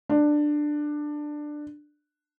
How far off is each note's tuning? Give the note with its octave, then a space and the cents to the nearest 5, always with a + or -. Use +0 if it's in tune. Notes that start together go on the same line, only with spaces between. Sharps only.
D4 +15